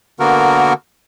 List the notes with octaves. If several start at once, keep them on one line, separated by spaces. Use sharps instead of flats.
D3 A#3 B3 F#4 A#4